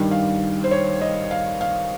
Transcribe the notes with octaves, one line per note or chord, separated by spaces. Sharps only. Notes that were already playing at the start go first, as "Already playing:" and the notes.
Already playing: G2 D#3 G3
F5
C5
C#5
D#5
F5
F5